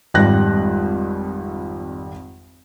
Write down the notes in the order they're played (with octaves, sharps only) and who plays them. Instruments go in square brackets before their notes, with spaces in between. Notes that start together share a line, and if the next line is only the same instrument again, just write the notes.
[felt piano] G#1 F2 G3 F#6 A#6